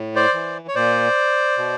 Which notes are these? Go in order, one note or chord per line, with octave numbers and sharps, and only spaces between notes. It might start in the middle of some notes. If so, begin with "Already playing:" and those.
Already playing: A2
C5 D5
E3
C#5
A#2 C5 D5
B2